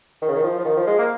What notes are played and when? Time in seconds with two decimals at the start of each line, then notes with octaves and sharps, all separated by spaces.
0.22 D#3
0.28 C#3
0.36 D#3
0.44 F3
0.59 F3
0.65 D#3
0.77 F3
0.87 G#3
0.99 A#3